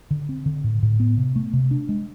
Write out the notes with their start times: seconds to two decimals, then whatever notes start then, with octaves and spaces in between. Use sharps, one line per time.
0.11 D3
0.29 C4
0.46 D3
0.64 A2
0.83 A2
1.00 B3
1.17 C3
1.36 A3
1.53 C3
1.71 D4
1.89 G#3